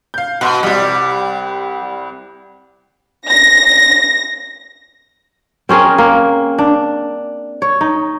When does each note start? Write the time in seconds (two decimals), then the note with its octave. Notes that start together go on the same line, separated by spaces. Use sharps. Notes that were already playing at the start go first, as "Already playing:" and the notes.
0.14 F5 G6
0.41 B2 F#5 C6 F#6
0.63 C2 G3 F#5
3.28 A#6
5.69 C4 C#4 G#4 A#4
5.98 A#3
6.59 D4
7.62 C#5
7.81 D#4